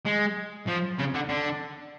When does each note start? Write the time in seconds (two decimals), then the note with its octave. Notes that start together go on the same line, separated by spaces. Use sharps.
0.06 G#3
0.67 F3
0.98 C#3
1.14 D3
1.29 D3